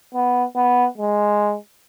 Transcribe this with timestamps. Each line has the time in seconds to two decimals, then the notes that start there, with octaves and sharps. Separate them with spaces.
0.14 B3
0.56 B3
0.98 G#3